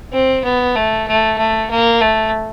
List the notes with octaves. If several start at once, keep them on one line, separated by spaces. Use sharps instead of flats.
C4
B3
A3
A3
A3
A#3
A3